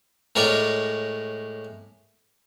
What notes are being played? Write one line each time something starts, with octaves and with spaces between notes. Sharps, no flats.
A2 G#3 A#4 C#5 D5 D6